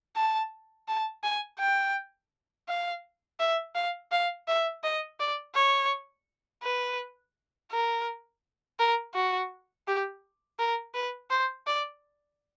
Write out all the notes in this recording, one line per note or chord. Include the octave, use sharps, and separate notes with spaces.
A5
A5
G#5
G5
F5
E5
F5
F5
E5
D#5
D5
C#5
B4
A#4
A#4
F#4
G4
A#4
B4
C5
D5